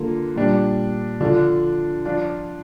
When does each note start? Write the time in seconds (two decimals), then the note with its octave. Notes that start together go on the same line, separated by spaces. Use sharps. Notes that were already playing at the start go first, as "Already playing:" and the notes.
Already playing: D3 A#3 F4
0.36 A#2 G3 D4
1.21 D3 F3 D4 F4
2.05 F3 D4 F4